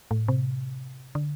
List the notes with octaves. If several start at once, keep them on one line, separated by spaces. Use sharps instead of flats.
A2
C3
D3